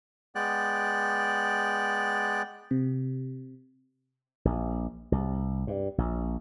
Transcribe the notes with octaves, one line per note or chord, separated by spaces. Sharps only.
G#3 B3 D5 G5 F#6
C3
A#1
C2
G2
A#1